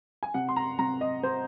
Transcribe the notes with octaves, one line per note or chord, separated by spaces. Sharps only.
G#5
C3 F#5
C6
A#5
C3 A#5
D#5
C3 C5